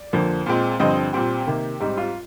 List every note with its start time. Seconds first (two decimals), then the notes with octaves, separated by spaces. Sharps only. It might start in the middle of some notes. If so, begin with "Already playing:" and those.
Already playing: D5
0.13 F2 D3 F3 A#3
0.46 A#2 G#3 C4
0.80 G2 D3 F3 C4 D#5
1.13 A#2 G3 C4 G4
1.47 C3 D#3 A#3
1.80 G#2 G3 C4 D#4
1.97 F4